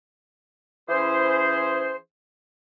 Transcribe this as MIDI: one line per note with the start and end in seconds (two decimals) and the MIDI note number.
0.89 1.95 52
0.89 1.95 61
0.89 1.95 64
0.89 1.95 68
0.89 1.95 72